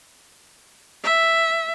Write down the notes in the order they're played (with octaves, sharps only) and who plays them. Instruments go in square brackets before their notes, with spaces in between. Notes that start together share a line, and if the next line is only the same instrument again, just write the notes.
[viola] E5